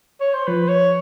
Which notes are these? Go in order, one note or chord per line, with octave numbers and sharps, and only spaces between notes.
C#5
C5
F3 B4
C#5